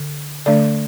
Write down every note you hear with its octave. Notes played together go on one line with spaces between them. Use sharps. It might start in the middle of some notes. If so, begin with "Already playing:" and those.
Already playing: D3
D3 A3 D4 D5